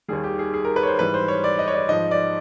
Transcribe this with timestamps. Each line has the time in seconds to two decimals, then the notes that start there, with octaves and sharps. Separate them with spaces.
0.08 D#2 D#3 G3 G#4
0.24 G4
0.39 G#4
0.54 G#4
0.65 A#4
0.76 B4
0.83 C#5
0.87 C5
0.99 G#2 E3 G3 B4
1.14 C5
1.28 C#5
1.44 D5
1.59 D#5
1.68 C#5
1.74 D5
1.89 G#2 F3 D#5
2.11 D5